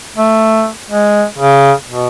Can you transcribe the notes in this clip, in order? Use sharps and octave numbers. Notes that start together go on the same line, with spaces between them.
A3
G#3
C#3
B2